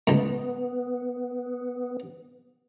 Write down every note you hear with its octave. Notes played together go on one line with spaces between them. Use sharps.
C#2 A2 B3